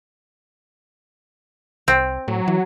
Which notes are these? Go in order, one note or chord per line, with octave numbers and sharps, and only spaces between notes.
C2 C4
A2 F#3
E3